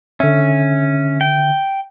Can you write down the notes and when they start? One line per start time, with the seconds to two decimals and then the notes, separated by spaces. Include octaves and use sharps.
0.20 D3 C#4 E5
1.21 G5